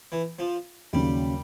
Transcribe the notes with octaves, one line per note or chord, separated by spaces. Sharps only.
E3
F3
D#2 C#3 F#3 G3